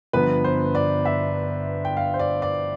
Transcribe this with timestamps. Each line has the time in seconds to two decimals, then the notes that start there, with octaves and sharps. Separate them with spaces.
0.13 G1 G2 F3 B3 B4
0.44 C5
0.75 D5
1.05 E5
1.85 G5
1.97 F5
2.14 C5
2.19 D5
2.42 D5